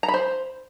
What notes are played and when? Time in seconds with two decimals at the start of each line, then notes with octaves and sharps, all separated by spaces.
0.03 A#5
0.08 B5
0.14 C5